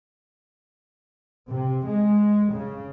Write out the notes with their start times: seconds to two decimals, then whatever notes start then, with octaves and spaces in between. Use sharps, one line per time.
1.51 C3
1.86 G#3
2.54 C#3